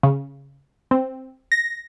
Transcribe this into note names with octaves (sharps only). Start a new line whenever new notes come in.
C#3
C4
A#6